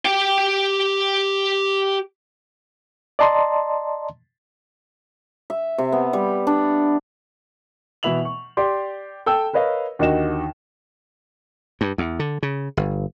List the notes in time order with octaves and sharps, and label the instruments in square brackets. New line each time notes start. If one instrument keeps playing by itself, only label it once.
[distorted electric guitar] G4 G5
[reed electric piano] D5 D#5 A5 A#5 C6
[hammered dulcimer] E5
C3
B3
G3
D4
[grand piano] B2 E3 E4 E5 F7 F#7
C#6
G4 D5 C6
A4 G5 E6
A#4 B4 C#5 D#5 F5
D#2 D3 D#4 F#4 D#5 E7
[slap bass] G2
E2
D3
C#3
G1